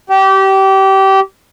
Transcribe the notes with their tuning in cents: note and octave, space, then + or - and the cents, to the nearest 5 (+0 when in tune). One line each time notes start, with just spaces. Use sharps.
G4 -25